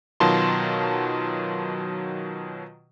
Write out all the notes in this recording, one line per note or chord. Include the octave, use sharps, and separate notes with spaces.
B2 D#3 F#3 F4 A5 C6